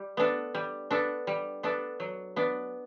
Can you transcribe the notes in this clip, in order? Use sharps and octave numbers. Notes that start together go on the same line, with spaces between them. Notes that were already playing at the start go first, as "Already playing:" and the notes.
Already playing: G3
B3 D4 A4
G3
B3 D4 A4
G3
B3 D4 A4
F#3
B3 D4